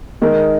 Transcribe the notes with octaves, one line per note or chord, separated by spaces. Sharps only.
D#3 G#3 D#4 A#4